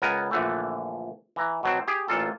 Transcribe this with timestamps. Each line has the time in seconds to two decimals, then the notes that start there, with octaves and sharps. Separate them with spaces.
0.02 C#2 B3 A#4 G#5
0.31 A#1 D3 E3 A3
1.36 E3 A#5
1.63 B2 F#3 C4
1.88 G4 G#4
2.08 A1 A#2 F4 A4